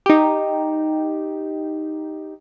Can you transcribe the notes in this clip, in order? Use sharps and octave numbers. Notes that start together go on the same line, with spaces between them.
D#4 G4